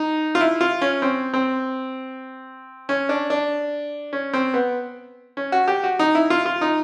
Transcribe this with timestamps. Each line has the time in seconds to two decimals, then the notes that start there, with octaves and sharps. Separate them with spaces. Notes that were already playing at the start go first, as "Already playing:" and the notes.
Already playing: D#4
0.35 F4
0.41 E4
0.61 F4
0.82 C#4
1.02 C4
1.34 C4
2.89 C#4
3.09 D4
3.30 D4
4.13 C#4
4.33 C4
4.54 B3
5.37 C#4
5.52 F#4
5.68 G4
5.84 F#4
5.99 D#4
6.15 E4
6.30 F4
6.46 F4
6.61 D#4